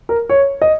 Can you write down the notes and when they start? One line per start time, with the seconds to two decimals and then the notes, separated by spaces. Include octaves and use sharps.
0.09 A#4
0.29 C#5
0.62 D#5